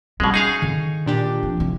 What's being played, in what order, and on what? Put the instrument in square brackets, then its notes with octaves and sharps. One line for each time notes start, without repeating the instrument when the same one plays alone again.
[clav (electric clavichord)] B2 G#3 [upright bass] G3 C#4
[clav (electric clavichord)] D#4 G#4 F5 [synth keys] C#6
[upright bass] D3 D#3
[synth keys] A#2 D4 G4
[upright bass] F2
F1 E3